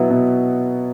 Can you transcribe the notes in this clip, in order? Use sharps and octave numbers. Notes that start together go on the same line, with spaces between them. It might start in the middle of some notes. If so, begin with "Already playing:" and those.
Already playing: B2 F#3 B3 E4
B2